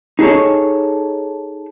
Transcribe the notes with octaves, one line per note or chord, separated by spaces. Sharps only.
D#4 G#4 A4 C#5